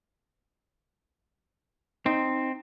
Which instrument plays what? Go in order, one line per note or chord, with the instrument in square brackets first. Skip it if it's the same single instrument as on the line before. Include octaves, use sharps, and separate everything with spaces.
[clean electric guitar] C4 [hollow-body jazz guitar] D#4